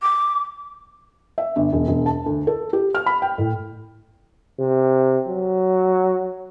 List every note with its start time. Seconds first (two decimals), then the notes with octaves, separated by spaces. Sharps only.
0.02 D6
1.38 E5
1.56 G1
1.73 E1
1.88 E1
2.06 A5
2.26 D2
2.47 A4
2.73 G4
2.95 F6
3.06 B5
3.22 G5
3.38 A2
4.59 C3
5.27 F#3